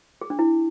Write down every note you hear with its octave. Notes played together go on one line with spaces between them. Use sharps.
G#4
D4
E4